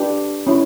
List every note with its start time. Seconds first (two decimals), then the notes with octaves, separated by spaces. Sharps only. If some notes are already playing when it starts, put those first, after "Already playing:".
Already playing: D4 G4 B4
0.47 C#4 E4